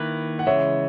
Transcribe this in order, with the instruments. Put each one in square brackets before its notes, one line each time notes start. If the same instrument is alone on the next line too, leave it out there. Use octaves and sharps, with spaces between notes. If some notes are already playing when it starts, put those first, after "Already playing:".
Already playing: [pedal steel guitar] D#3 A#3 E4 B4
[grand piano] F#5
[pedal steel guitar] C#3 E3 G#3 [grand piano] C#5 E5